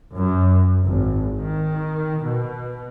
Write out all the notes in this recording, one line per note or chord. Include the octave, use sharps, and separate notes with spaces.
F#2
G#1
D#3
B2